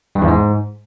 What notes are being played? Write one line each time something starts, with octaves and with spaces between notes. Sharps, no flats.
G2
E2
G#2